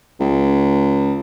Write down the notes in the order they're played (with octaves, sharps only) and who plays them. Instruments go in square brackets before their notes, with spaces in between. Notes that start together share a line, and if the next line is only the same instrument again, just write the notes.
[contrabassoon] C#2